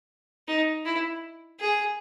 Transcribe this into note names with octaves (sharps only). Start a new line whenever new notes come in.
D#4
E4
G#4